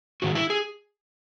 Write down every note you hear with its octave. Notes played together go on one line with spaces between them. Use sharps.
G#2 D#3 G#3 F#4
E4
G#4